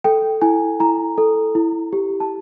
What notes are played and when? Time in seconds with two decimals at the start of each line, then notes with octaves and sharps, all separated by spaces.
0.04 A4 G5
0.42 E4 G#5
0.80 E4 A#5
1.18 A4
1.55 E4
1.93 G4
2.20 A5